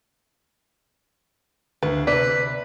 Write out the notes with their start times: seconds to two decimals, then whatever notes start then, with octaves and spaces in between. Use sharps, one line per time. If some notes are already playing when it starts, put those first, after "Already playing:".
1.83 D2 B4
2.07 C3 B4 D5